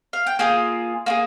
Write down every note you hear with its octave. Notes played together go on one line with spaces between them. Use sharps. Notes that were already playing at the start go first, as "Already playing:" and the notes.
F5
G5
A#3 F4 G#4 G#5
A#3 F4 G#4